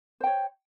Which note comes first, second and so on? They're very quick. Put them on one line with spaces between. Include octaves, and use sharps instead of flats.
C5 G5 C#5